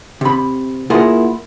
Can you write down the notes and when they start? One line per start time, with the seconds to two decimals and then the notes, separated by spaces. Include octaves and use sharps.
0.21 C3 B5
0.90 A#3 E4 F4 G#4 A#4 F#5